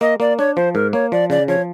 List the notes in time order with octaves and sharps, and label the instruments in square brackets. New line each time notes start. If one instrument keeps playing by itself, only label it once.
[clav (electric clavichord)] A#3 [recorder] D#5
[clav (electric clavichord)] A#3 [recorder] D5
[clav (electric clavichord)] D4 [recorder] C#5
[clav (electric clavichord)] F3 [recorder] C5
[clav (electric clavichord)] G#2 [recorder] A#4
[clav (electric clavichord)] A#3 [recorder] C#5
[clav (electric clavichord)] F3 [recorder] D5
[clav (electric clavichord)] C#3 [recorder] D5
[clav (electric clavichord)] F3 [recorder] C#5